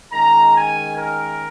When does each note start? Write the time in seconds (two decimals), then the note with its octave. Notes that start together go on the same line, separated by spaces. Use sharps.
0.12 D#3 G#3 C#4 A#5
0.55 G#5
0.96 A#4